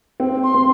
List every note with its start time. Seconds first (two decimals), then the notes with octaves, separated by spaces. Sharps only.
0.20 C4
0.43 C6
0.54 C4